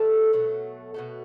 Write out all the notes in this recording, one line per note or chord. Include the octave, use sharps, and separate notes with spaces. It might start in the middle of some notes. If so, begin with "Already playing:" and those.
Already playing: D3 G3 A3 A4
B2 F#3 A3
B2 F#3 A3